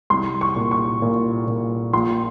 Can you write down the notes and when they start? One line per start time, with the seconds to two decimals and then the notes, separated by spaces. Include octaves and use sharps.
0.10 C2 C6
0.41 C#6
0.56 A#2
0.71 C#6
1.02 A#2
1.47 A#2
1.93 A#1 C6